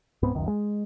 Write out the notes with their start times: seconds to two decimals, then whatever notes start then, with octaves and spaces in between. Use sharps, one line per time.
0.22 C#2 G#2 B3 C4
0.34 D#1 C#2 F#2 D#3
0.48 G#3